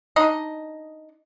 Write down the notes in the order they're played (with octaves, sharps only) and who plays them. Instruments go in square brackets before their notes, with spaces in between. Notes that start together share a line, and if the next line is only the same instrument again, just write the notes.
[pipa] D4 D#4 D#5